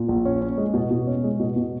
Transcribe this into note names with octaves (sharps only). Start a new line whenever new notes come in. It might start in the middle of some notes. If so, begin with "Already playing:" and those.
Already playing: A#2
A#1
C#4
C#4
G#3
B2
B2
C#4
G#3
B2
B2